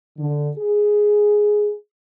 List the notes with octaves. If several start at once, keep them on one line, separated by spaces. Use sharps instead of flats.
D3
G#4